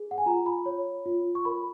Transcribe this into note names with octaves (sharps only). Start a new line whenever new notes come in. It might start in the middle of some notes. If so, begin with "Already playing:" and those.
Already playing: G#4
F#5
G#5
F4 A#5
B5
C#5
F4
C#6
A#4 B5